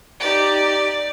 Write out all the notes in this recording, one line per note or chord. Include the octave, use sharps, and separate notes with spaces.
D#4 G4 D5